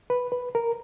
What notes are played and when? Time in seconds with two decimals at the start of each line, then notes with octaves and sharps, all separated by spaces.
0.10 B4
0.32 B4
0.55 A#4